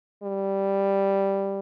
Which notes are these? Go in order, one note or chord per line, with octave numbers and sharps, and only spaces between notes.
G3